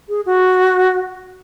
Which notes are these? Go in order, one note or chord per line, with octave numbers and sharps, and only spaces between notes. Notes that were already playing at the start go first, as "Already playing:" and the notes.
G#4
F#4